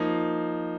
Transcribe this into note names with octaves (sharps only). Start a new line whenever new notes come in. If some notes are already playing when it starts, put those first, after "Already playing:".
Already playing: F3 A#3 D#4